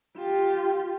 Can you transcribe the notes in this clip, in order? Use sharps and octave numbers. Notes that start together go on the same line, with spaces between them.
F4 G4